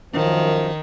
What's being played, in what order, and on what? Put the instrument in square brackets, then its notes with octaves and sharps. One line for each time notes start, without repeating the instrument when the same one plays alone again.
[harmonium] F#2 F3 [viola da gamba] D#3